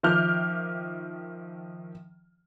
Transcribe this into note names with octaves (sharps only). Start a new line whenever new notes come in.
D#3 F3 E5 D6 F6 G6